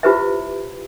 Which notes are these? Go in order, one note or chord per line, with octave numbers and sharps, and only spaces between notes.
E4 F4 G4 B4 C5 E5